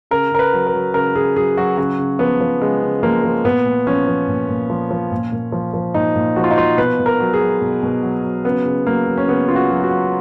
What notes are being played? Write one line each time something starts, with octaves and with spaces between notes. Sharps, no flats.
C#3 A#4
C#3 A#4
B4
F#3
A#4
F#3
C#3 A#4
C#3 G#4
F#3 G#4
F#3 F#4
C#3 F#4
C#3
F3 B3
F3
C#3 G#3
C#3
F3 A#3
F3
A#2 B3
A#2
F3 C#4
F3
A#2
A#2
F3
F3
A#2
A#2
F3
F3
A#2 D#4
A#2
F3 F#4
F4
D#4
F3 F4
B2 B4
B2
A#4
F#3
G#4
F#3
B2
B2
F#3
F#3
C#3 B3
C#3
F#3 A#3
F#3
C#4
C#3 B3
C#3 F4
F#4
F#3
F#4
F#3